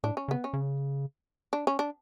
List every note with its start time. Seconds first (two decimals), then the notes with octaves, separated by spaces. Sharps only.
0.04 A2 D4
0.17 C#4
0.28 C#3
0.31 B3
0.44 C#4
0.54 C#3
1.53 D4
1.67 C#4
1.79 D4